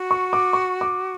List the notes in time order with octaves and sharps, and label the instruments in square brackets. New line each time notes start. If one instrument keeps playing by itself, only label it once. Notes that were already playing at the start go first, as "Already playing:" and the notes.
Already playing: [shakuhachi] F#4
[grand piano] C#6
D6
C#6
D6